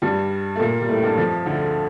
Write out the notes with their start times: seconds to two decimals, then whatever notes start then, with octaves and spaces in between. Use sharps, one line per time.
0.02 G2 G3
0.56 A3
0.60 A#2 A#3
0.81 G3
0.89 A2 A3
1.03 G2 G3
1.17 F2 F3
1.46 D2 D3